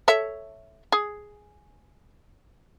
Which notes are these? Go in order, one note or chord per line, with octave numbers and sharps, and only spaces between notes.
A4 C#5 E5
G#4